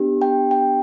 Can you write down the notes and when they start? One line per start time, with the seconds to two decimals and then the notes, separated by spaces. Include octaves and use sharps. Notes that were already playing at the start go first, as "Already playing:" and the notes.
Already playing: B3 D4 G4
0.22 G5
0.51 G5